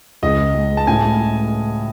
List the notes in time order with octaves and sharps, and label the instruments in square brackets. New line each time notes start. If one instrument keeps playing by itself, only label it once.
[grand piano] C#2 [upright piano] D#5
[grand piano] G#3
[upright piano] A5
[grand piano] A2 [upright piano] G#5